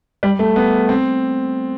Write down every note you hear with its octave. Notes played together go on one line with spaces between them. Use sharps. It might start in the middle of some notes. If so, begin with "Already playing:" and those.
G3
A3
B3
C4